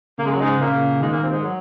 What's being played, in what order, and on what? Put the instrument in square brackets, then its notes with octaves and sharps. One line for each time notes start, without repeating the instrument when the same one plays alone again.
[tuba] C#3 [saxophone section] A#3
[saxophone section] G#3
F#3
G#2 G#3
[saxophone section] A#2 A#3 [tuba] C#3
[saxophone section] G#2 G#3 [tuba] D#3
[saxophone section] A#2 A#3
C3 C4
G#2 G#3
F#3